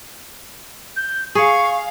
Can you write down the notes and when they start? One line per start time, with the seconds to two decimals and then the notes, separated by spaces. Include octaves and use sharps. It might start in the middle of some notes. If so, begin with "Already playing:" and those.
0.96 G6
1.35 G#4 F5 C#6